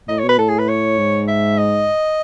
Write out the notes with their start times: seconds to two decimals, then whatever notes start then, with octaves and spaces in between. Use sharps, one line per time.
0.09 A2 D#5
0.19 C#5
0.24 B2
0.29 B4
0.38 A2 A4
0.49 G#4
0.59 B4
0.69 C#5
0.99 G#2
1.28 E5
1.58 D#5